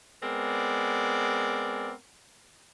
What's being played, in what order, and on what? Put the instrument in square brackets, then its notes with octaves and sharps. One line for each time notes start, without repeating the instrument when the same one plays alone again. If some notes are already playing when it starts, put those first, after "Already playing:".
[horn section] G#3 B3 C4 A#4 D5